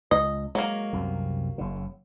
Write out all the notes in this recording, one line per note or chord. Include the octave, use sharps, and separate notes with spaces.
C#2 D#5
F#3 G#3 A#3
C2 F#2 C3
F#1 C#3